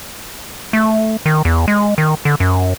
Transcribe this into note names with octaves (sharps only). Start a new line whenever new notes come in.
A3
D#3
E2
G#3
D#3
D3
F#2